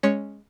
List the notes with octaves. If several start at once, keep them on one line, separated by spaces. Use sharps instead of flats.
G#3 C#4 C#5